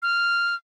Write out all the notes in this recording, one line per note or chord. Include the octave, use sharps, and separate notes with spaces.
F6